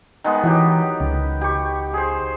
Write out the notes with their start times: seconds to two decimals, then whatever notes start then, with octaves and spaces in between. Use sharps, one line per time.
0.24 D#3 G#3 B3
0.44 E3 F#3 G4
1.00 C#2
1.41 G4 C#6
1.94 G#4 C5